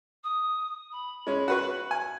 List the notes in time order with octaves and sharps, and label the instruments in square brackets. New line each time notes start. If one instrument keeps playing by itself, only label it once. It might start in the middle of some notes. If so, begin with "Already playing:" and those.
[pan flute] D#6
B5
[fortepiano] G#3 C#4
F#4 B4 C#6
G#5